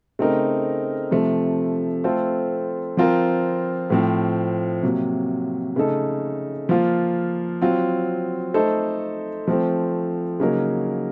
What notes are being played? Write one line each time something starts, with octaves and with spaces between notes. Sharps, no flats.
C#3 A3 C4 D#4 A#4
C3 F3 A3
A3 C4 F4 A4 C5
F3 C4 F4 A#4
A2 F3 C4
C3 F#3 A#3
C#3 A3 D#4 A4
F3 A#3 F4
F#3 C4 F4
A3 D#4 A4 C5
F3 A3 C4
C#3 F#3 A#3 D#4 A#4